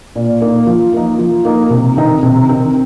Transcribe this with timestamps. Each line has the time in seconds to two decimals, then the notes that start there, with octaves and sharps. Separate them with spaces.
0.16 A#2
0.42 A#3 D#4
0.67 F3
0.94 A#3 D#4
1.19 F3
1.45 A#3 D#4
1.70 C3
1.97 D#3 C4 D#4
2.23 C3
2.49 D#3 C4 D#4